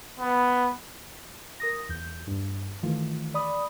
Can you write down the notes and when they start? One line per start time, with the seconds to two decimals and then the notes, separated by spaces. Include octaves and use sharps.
0.20 B3
1.60 A#4 D#6 A#6
1.89 E2 G6
2.27 G2
2.83 D#3 E3 A3 F4
3.34 D5 B5 D#6